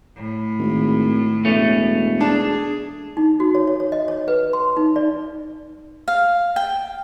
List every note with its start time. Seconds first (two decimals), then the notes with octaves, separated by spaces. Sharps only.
0.17 A2
0.59 G#1
1.45 E1 A3 C#4
2.21 D4 G#4 A5
3.17 D#4
3.40 F#4
3.55 C#5
3.67 C#5
3.80 C#5
3.92 D#5
4.08 C#5
4.28 B4
4.53 C6
4.77 D#4
4.96 D5
6.08 F5
6.56 G5